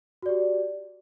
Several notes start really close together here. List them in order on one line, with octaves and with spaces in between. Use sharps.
F#4 D5 G4